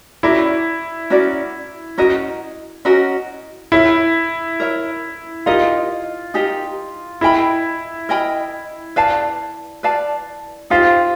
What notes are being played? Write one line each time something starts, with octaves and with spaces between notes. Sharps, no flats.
C#4 E4 F#4 A#4 D5
C#4 F#4 A#4 D5
C#4 F#4 A#4 D#5
C#4 F#4 A#4 D#5
E4 A#4 C#5 E5
A#4 C#5 E5
D#4 F4 G4 A#4 D#5
D#4 G4 A#4 D#5
E4 A#4 D#5 G5 B5
A#4 D#5 G5 B5
B4 D5 F5 A5
B4 D5 F5 A5
D#4 F4 G4 C5 F5